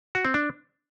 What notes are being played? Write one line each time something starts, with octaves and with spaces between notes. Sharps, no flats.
F#4
C4
D4